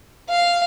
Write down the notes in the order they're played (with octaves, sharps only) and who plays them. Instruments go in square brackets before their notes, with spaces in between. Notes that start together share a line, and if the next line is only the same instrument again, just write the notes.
[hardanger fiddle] F5